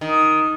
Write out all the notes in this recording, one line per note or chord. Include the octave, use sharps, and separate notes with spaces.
D#3